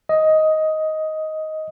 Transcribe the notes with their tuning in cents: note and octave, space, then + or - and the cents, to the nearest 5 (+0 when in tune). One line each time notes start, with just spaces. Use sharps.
D#5 +10